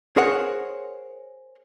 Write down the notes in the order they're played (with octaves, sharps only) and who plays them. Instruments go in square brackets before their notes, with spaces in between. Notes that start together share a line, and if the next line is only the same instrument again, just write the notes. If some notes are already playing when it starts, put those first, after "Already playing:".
[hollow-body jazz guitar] G#4 A#4 C5 C#5 F#5